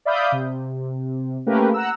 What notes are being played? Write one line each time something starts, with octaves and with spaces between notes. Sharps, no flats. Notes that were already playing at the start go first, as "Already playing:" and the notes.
D5 E5 F5 B5 D#6 G6
C3
A3 A#3 C#4 G4 A#4 B4
F#5 A#5 E6